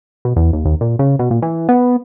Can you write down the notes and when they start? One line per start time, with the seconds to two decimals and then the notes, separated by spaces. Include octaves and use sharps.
0.25 B2
0.36 E2
0.53 D#2
0.65 D#2
0.81 A#2
0.99 C#3
1.19 B2
1.31 A#2
1.42 E3
1.69 B3